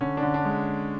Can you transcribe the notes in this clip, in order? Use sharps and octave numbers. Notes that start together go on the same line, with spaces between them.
D3 C#4
D4
D3
D4
G#3